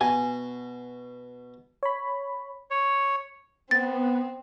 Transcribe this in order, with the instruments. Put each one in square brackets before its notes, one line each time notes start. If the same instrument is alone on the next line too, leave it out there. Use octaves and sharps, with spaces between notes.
[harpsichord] B2 [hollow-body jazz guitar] G#5
[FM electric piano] C#5 B5
[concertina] C#5
[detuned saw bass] B3 [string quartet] C4 [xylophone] A6